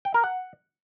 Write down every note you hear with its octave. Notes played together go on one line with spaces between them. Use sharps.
G5
A#4
F#5